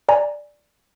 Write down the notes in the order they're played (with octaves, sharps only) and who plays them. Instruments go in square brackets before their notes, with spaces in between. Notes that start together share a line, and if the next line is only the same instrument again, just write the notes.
[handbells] D5 G#5 A#5